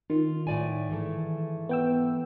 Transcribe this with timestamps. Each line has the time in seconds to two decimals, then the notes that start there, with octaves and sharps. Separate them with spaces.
0.10 D#3 F4
0.47 A2 D5 G#5
0.89 G#2 E3 A3
1.69 B3 G5 E6